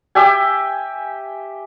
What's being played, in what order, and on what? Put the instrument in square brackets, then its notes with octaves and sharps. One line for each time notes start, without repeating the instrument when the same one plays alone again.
[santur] G4 E5 G5 G#5